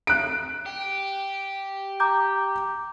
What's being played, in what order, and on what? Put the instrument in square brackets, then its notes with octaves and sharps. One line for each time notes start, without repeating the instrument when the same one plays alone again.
[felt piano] F#6 D7
[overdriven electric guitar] G4
[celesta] A#5 D6 G6